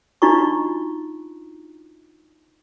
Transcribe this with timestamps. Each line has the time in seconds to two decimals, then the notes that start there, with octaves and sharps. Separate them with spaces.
0.22 D4 D#4 F4 F#4 A#5 C#6